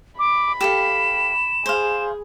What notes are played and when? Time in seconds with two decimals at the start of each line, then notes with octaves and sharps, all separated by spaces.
0.19 B5 D6
0.61 G4 A4 F5 E7
1.66 G#4 C5 F5